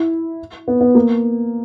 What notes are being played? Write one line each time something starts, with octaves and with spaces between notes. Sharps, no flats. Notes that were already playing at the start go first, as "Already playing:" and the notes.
Already playing: E4
B3
B3
A#3